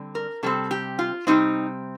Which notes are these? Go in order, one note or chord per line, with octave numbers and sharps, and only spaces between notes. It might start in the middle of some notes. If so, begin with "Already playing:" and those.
Already playing: D3 G3 C4
A#4
C3 G3 C4 A4
G4
F4
C3 G3 C4 D#4